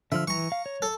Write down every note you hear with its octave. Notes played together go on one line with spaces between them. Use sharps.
D3 F3 E5 F6
E3 A#5 C#6
F5
C#5
A4